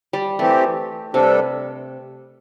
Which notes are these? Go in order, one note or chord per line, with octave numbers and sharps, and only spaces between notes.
G3
E3 A3 C4 G4
G2 C3 G3 D4 A4